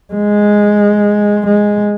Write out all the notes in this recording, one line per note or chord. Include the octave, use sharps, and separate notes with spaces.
G#3
G#3